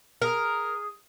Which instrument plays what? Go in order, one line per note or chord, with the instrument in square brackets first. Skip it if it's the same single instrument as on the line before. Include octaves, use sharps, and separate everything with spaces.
[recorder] G#4 [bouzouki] A#4